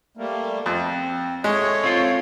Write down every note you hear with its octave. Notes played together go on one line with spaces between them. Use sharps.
G3 A3 A#3
F2 C4
G#3 A3 C#5
C4 F4